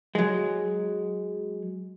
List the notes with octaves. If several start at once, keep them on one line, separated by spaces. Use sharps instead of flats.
F#3 G#3